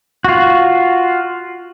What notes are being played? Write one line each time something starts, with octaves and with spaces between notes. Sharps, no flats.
F4 F#4